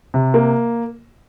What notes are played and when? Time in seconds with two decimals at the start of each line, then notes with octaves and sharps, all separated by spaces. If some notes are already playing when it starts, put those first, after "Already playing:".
0.14 C3
0.34 A#3